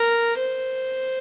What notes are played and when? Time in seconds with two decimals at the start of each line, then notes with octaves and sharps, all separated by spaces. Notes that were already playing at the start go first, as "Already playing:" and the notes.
Already playing: A#4
0.38 C5